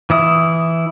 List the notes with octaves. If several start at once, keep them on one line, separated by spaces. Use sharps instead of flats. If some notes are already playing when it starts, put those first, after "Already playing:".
E3 E4 D#6